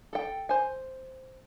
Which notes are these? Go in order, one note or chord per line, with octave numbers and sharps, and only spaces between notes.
A4 G5
C5 G#5